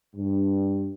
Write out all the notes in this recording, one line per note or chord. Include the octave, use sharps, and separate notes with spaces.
G2